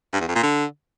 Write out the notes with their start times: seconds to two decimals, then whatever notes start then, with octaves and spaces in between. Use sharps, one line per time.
0.13 G2
0.21 E2
0.28 F2
0.35 A#2
0.43 D3